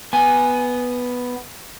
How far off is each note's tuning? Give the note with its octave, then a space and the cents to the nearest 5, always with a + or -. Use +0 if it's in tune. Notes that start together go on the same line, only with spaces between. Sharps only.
B3 +0 G#5 +0